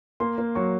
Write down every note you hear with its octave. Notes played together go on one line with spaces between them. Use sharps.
A#3 C6
A#3
F#3 C#6